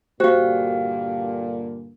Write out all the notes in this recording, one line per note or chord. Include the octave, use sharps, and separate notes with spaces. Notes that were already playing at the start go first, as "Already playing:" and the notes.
G2 A#2 D3 F#4 G4 C5 F5